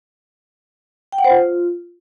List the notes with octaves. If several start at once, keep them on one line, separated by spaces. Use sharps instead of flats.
G5
F#5
C5
F4